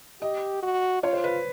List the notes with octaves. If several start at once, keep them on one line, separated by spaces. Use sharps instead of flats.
G4 D#5
F#4
F4 C#5
C5
B4